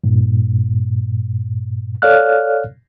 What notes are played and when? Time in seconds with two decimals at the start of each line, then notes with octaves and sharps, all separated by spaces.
0.04 G2 A#2
2.02 A4 C#5 D5 F5 F6 F#6